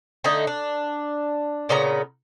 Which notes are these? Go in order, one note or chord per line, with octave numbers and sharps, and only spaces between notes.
D3 A3 D#4 D#5
D4
A#2 C#3 B3 A#5